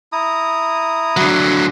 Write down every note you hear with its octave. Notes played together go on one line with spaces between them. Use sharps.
E4 A#5 D#6
D3 F#3